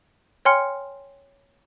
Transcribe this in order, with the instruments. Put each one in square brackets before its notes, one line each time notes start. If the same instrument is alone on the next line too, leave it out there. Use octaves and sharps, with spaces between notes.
[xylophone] C#5 G5 G#5 C6 F6 C#7